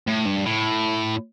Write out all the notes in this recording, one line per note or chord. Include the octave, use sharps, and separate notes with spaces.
A2
G2
A2